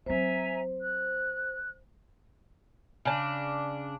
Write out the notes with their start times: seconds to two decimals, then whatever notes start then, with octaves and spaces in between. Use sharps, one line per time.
0.06 F#3 C4 C5 E5 G#5 A#5
0.80 F#6
3.05 C#3 D4